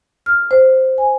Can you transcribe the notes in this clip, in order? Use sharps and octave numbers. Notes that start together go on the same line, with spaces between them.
F6
C5
G#5